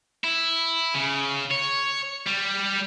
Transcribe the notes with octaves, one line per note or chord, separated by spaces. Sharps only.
E4
C#3
C#5
G3